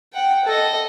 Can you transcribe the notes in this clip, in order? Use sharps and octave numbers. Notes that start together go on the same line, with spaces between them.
F#5 G5
A4 D#5